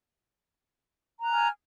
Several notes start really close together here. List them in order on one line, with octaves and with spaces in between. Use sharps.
A#5 F#6 G#5 F6